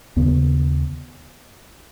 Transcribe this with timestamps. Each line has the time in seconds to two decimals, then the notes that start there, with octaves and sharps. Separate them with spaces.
0.16 D#2 C#3 B3